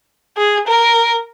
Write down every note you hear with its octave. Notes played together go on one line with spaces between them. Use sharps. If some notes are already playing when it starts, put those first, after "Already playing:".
G#4
A#4